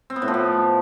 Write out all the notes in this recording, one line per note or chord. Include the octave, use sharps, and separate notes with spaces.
C4
B3
A2
F3
A2